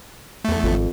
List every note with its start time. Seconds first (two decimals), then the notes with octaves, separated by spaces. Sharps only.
0.45 E2 A3
0.63 G#1 F2